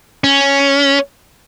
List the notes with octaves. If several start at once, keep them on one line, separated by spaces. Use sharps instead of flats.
C#4